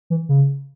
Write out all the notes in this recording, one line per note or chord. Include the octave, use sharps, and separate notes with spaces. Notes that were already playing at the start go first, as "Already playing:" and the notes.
E3
C#3